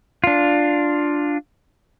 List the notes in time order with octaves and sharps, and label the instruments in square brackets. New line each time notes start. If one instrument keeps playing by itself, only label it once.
[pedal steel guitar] D4 F4